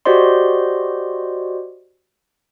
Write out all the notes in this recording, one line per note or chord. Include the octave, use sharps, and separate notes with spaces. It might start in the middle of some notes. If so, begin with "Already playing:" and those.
F#4 G4 C5 D5 D#5 C6